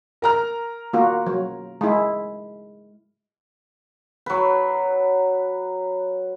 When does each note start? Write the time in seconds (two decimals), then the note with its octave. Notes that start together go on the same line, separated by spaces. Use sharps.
0.22 A#4 A#5 F6
0.93 A#3 F4 F#4
1.27 F#3
1.81 G#3 E4
4.26 F#3 B4